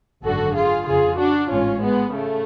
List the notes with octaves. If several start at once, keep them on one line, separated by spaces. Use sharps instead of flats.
G#1 F#2 D3 F#4 A4
F4 G#4
F2 C#3 F4 G#4
D4 F#4
A1 G#2 C#4 F4
G#3 B3
C#3 A3